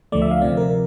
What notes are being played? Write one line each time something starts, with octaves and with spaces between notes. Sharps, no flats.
D2 D3 F3 A3 D5
E5
F5
C3 F3 C4 D5
A#4